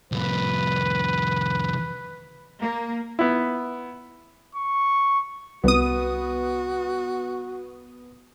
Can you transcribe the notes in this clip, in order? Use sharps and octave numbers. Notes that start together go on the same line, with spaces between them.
C2 F2 B4
A#3
B3 E4
C#6
C2 B3 F#4 D#6